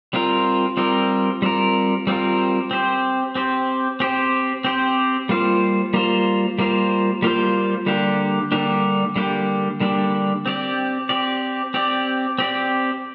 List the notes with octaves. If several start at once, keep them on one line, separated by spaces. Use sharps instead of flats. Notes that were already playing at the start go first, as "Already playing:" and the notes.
G3 C4 F4 A#4
G3 C4 F4 A#4
G3 C4 F4 A#4
G3 C4 F4 A#4
C4 G4 C5
C4 G4 C5
C4 G4 C5
C4 G4 C5
G3 A#3 F4 C5
G3 A#3 F4 C5
G3 A#3 F4 C5
G3 A#3 F4 C5
D3 G3 A#3 D4 G4
D3 G3 A#3 D4 G4
D3 G3 A#3 D4 G4
D3 G3 A#3 D4 G4
C4 G4 D5
C4 G4 D5
C4 G4 D5
C4 G4 D5